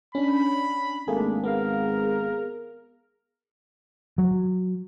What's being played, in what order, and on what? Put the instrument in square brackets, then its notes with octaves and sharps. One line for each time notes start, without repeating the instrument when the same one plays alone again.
[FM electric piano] C#4 D4 [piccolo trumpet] B5
[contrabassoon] G#1 [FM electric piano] A3 A#3 G#4 [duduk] D4
[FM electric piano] B3 F5 [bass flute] G#4 [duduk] A#4
[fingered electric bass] F#3